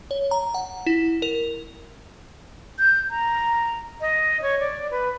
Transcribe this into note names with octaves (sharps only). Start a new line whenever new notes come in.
C#5
A#5
F#5
E4
A#4
G6
A#5
D#5
C#5
D5
B4